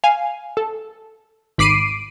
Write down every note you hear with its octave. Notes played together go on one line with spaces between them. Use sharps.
F5 G#5
A4
G#1 B5 D6 C7 D7 D#7